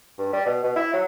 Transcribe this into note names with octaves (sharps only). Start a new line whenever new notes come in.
G2
G3
B2
B2
E4
F#3